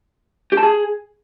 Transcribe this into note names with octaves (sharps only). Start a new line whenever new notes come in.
G4
A5
G#4